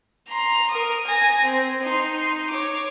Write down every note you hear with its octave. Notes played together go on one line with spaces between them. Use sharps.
A#5 C6
A#4 D#6
G#5 A#6
C4
D#4 C6
C#5 D6